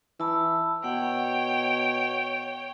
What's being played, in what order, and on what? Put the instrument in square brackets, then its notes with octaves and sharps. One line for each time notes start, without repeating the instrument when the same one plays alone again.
[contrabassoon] E3 [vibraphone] A5 B5 E6
[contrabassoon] B2 [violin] C#5 G5 [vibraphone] F#5